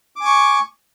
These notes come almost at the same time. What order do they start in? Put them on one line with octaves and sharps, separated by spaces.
D6 G#5 C#6